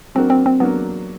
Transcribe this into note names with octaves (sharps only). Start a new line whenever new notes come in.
F#3 A#3 C4 D4 F#4 A#4
C4
C4
F#3 A#3 B3 D4 F#4 A#4